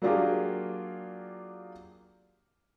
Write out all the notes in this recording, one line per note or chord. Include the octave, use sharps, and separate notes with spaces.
F#3 A#3 D4 F4 G4 G#4